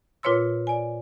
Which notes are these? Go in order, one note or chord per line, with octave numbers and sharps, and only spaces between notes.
A#2 F4 B4 C#5 C6 E6
D5 G#5